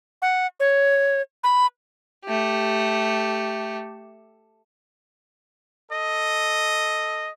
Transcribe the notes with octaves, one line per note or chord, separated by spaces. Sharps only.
F#5
C#5
B5
A3 G4
A4 D#5